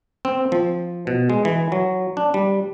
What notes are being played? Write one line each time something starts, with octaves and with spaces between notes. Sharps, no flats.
C4
F3
B2
G#3
E3
F#3
D4
G3